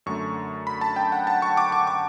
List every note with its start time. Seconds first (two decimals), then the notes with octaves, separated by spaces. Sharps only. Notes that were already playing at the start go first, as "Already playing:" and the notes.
0.06 F#2 D3 A3 C#6
0.67 B5
0.81 A5
0.96 G5
1.12 F#5
1.27 A5
1.42 C#6
1.57 D6
1.72 C#6
1.87 D6